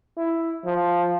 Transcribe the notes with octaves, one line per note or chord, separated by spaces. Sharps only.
E4
F3